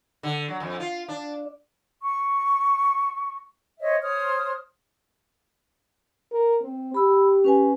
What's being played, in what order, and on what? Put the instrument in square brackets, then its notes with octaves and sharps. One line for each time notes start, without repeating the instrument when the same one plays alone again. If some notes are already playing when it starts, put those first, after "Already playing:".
[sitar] D3
F#3
F2
F4
D4
[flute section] C#6
C5 C#5 D#5 E5
C5 C#5 D#6 F6
[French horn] A#4
C4
[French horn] G4 [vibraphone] B5 E6
[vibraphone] C#4 B4 G#5